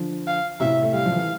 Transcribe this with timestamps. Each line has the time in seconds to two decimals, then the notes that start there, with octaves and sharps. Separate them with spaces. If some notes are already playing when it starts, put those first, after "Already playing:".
Already playing: D3 F3
0.27 F5
0.60 A2 C3 E5
0.83 A3
0.94 G3 F5
1.06 F3
1.16 E3